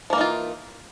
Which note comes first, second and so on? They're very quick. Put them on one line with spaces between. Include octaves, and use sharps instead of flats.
F3 A#3 E3 D#4 F4